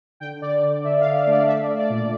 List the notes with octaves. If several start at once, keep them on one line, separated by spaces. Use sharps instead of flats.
D3 G5
D3 D5
D3
D3 E5
F5
D3
F5
A3
D5
A3 E5
D5
A3
D5
A#2
D5